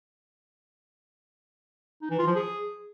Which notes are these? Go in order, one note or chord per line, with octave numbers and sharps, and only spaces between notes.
D#4
E3
F4
F3
G#4